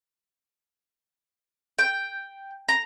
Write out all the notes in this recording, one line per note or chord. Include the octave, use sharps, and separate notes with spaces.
G5
A#5